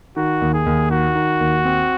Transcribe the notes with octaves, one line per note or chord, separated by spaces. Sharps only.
D#3 F#4
D#2
G#4
D#2
D#3 F#4
D#3
D#2
C4